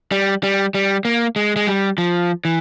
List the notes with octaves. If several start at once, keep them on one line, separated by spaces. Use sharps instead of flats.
G3
G3
G3
A#3
G#3
G#3
G3
F3
E3